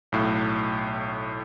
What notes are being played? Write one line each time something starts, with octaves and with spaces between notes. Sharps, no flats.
B1 A2